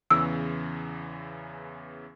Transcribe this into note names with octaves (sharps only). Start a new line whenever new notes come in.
E2 C#3 E3 E6